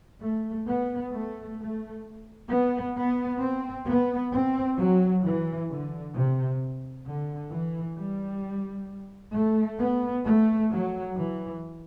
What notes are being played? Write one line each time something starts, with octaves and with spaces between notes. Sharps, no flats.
A3
B3
A3
A3
B3
B3
C4
B3
C4
F#3
E3
D3
C3
D3
E3
G3
A3
B3
A3
F#3
E3